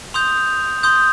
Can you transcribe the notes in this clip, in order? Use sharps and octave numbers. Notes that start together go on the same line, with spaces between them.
C6 D#6 G6 F7
C6 D#6 G6